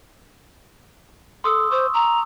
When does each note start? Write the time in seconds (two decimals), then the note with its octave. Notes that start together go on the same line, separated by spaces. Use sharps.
1.44 A4 C6 D#6 E6
1.71 C5 C#6
1.94 A#5